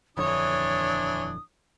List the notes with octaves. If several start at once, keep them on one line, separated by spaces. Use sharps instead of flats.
D#1 F2 D3 E3 D4 C#5 D#6